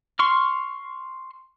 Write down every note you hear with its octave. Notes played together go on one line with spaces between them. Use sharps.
C6 C#6 F6